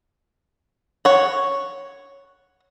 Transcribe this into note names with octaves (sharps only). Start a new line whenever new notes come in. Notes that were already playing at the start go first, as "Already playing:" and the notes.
C#5 F#5